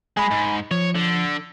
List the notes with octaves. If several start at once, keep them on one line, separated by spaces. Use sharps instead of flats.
G#3 G#5 B5
G#2
F3 C#5
D3